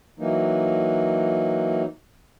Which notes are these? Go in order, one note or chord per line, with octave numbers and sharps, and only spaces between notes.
E3 F#3 A#3 D#4